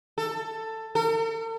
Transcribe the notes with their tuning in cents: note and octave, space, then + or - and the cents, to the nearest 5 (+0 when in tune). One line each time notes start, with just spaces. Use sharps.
A4 +15
A4 +45